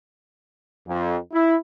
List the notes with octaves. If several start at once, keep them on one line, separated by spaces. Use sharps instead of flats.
F2
E4